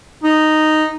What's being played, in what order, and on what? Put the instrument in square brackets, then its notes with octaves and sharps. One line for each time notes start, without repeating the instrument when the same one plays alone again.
[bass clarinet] D#4